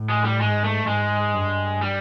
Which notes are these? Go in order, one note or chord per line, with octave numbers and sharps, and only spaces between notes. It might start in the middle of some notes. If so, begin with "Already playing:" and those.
Already playing: A2
G#3
G3
G#2 G#3
A3
G#2 G#3
G2
G3